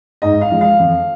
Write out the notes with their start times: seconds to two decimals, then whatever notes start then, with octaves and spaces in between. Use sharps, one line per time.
0.22 G#2 D#5
0.41 F5
0.52 F3 G#3
0.61 F5
0.80 F2